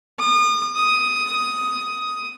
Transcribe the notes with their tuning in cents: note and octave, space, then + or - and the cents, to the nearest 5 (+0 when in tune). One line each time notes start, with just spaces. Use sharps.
D#6 -35
D#6 +10